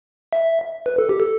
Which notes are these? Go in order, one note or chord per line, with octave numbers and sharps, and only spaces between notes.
E5
B4
A4
G4
A4